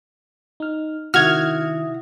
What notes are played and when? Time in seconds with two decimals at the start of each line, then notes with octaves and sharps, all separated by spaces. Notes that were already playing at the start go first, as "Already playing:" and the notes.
0.60 D#4 F6
1.14 C3 D#3 E4 F#4 E5 D#6 F6 G#6